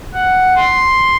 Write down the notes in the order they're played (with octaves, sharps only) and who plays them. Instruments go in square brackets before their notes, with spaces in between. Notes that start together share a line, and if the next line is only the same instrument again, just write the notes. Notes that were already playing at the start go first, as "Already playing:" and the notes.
[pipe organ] F#5
C6